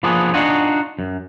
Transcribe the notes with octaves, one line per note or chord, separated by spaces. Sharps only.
F3 A#3 B3 D4 F4 G#4
D4 D#4 F4 F#4 F#5 G#5
F#2